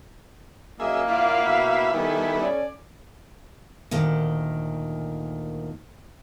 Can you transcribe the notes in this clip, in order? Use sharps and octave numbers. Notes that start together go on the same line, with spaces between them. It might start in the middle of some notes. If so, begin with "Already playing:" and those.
F#2 A#3 G#4 D#5 E5
A#2 E4 F4 F5 F#5 D6
B2 E4 E5 B5
D#3 G3 B3 E4 A4 G#5
C#4 D5
D2 A#2 D#3